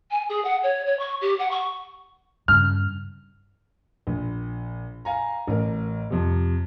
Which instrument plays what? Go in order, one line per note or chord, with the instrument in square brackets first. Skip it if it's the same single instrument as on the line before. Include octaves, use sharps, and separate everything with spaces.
[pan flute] G#5
G#4
F#5
C#5
C#5
C#6
G4
F#5
C#6
[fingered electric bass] G2 C#3 [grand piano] F6
[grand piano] A#1
F5 G#5 A#5
A1 A#4
F2 C3